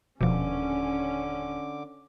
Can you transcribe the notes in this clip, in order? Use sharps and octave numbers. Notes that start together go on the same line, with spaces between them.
D#1 B2 D3 F3 C#4 D6